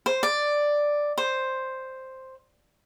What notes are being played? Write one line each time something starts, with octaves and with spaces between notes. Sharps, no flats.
C5
D5
C5